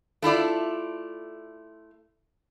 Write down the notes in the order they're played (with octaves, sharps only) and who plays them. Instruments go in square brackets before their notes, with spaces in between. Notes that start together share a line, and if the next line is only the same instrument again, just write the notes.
[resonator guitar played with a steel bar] A3 E4 F4 D5